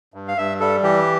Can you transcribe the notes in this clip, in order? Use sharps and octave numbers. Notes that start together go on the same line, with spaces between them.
G2
F5
G2 E5
G3 A4
E3 G4